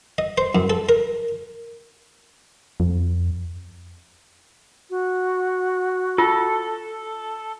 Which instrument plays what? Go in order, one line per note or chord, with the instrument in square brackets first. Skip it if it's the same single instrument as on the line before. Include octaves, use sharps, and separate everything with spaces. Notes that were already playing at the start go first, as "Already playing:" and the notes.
[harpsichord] D#5
C5
F#2
A4
A#4
[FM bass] F2
[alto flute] F#4
[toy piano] F4 [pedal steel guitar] A4